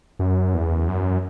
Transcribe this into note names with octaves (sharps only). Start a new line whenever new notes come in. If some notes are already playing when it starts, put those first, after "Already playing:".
F#2
E2
F#2